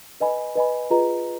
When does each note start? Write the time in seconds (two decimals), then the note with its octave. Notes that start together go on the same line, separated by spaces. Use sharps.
0.20 B4 D#5 G#5 B5
0.55 B4 D#5 G#5 B5
0.90 F4 G#4 B4 D#5 A#5